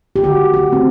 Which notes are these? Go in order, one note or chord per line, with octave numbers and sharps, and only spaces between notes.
G4
D3 F#4
F#4
A3 C4